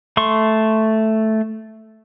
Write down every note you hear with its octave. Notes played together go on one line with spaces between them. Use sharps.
A3 C6 C#6